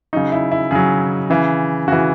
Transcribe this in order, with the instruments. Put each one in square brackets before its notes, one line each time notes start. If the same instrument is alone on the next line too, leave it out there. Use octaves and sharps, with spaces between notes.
[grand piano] C#3 F#3 D#4
E4
E4
C#3 F#3 G#4
C#3 E3
C#3 E3 F#4